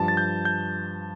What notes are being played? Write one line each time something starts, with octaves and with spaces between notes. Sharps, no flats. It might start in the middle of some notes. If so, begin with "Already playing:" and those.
Already playing: G2 F3 A5
A6
G6
G6